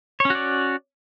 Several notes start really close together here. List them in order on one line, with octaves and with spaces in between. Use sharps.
C#5 C#4 F#4 D5